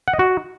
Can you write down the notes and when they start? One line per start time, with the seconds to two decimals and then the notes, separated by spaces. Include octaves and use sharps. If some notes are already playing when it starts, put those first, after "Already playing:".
0.08 F#5
0.13 D#5
0.19 F#4